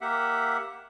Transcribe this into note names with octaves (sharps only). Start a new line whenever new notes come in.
A#3 G4 E5 F#5